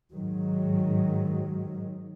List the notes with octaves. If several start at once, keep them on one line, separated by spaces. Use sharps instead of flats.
G#2 D#3 F#3